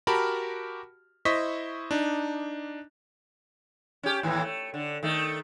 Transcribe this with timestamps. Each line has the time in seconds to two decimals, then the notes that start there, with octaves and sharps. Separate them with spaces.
0.07 F#4 G4 A#4 A5 B5 F6
1.25 E4 C5 D#5 C#6 B6
1.91 D4 D#4
4.03 C#4 G4
4.23 D#2 A2 E3
4.42 A3
4.74 D3
5.03 D#3 A3